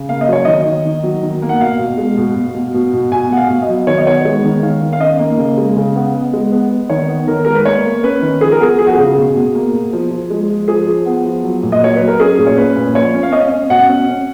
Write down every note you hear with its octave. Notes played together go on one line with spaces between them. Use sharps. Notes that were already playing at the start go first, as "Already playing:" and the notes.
Already playing: C#3
A#3 F5
D#5
F#3 C#5
D#3 D#5
D#3
D#3
F#3
D#3
A#3
F#5
B2 F5
B2
G#3
B2
B2
B2
B2
B2
B2 G#5
B2 F#5
F5
B2
D#5
F#3
D#3 C#5
D#5
B3 C#5
G#3
D#3
D#3 F5
D#3
F5
C#4 D#5
A#3
C#3
G#3
C#3
B3
B3
G#3
B3
B3
D#3 C#5
B3
D#3 A#4
G#3 A#4
B4
A#3 C#5
A#3
C#4 B4
D#3
F3 G#4
A#4
B3 G#4
F3 G#4
F#4
C#3 G#4
B2
B2
A#3
B2
F3
F3
G#3
F3
F3 G#4
F3
B3
F3
F#3
A#2
D#5
F#3 C#5
F#3 B4
A#4
C#4 G#4
A#2
C#5
C#4 B4
A#2
F3 C#5
C#4
F5
C#4 D#5
C#4
B2 F#5
C#4
C#4